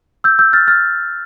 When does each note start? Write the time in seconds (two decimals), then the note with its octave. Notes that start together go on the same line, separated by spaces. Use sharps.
0.24 E6 G6
0.39 E6 G6
0.53 F6 A6
0.67 F6 A6